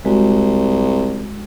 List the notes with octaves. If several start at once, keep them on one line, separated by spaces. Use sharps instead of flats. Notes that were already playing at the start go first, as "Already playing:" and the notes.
C2 G#3 F#4